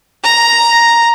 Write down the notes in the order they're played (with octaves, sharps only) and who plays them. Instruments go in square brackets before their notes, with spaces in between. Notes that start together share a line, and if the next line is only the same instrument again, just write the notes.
[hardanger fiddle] A#5